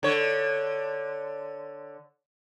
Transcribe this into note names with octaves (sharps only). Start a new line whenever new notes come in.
D3 C#5